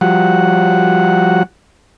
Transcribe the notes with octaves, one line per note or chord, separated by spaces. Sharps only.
F3 G3 F#4 F#5